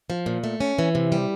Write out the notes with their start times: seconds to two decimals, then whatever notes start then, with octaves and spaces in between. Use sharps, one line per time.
0.10 F3
0.26 A#2
0.44 A3
0.60 C#4
0.79 E3
0.95 C3
1.12 G3